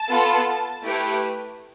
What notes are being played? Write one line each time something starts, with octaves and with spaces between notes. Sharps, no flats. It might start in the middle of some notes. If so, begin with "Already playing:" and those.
Already playing: A5
B3 F4 A4
A3 E4 G4 B4